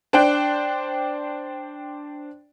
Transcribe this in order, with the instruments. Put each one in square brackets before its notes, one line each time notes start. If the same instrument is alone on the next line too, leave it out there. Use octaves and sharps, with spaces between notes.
[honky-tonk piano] D4 C5 D5 G5 F#6 D7